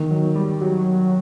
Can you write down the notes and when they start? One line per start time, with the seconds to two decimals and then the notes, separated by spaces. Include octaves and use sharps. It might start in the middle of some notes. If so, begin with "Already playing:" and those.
Already playing: D#3
0.10 F#3
0.35 G3
0.61 F#3